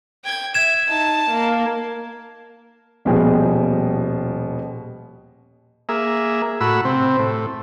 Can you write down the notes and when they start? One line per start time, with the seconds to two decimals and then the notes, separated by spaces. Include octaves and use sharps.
0.24 G5 G#6
0.54 E5 G#6 E7
0.89 D#4 A5
1.31 A#3
3.05 D#1 B2 F3 G3 G#4 G5
5.89 A#3 G#4 E5
6.61 A2 F#4 B5 E6
6.85 C3 C4
7.19 A2